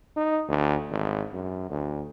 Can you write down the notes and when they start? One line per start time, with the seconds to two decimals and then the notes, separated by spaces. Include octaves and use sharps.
0.17 D#4
0.49 D2
0.91 G#1
1.33 F#2
1.71 D2